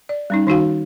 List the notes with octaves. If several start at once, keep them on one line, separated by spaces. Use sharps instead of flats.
D5
G3 C#4 D#4
D#3 D#4 F#4 F5